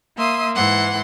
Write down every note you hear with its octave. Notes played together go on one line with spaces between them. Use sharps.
A#3 E5 C6 D#6
G#2 E3 F#5 C6